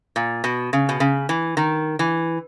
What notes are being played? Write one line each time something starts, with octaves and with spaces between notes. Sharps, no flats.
A#2
B2
C#3
B2
C#3
E3
D#3
E3